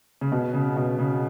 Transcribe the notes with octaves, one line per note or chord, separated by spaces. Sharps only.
C#3
B2
C#3
B2
C#3